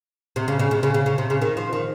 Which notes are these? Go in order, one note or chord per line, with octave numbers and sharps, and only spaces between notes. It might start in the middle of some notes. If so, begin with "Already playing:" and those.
C3
C#3
C#3
C3
C#3
C#3
C#3
C3
C#3
D#3
F3
D#3